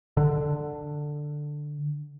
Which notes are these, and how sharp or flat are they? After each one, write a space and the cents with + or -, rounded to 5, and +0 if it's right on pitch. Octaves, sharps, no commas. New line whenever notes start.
D3 +10